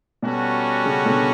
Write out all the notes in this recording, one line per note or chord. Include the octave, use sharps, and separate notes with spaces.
B2 G3 C#4 F#4 A4
C#3
B2 D3